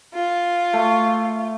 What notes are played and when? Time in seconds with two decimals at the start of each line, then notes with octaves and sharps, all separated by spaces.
0.15 F4
0.73 A3